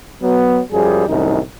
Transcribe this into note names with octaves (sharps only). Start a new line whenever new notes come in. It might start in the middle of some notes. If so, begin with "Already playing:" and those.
F#3 B3
F#2 F3 G3 G#4
C2 F#2 A2 D#3 D#4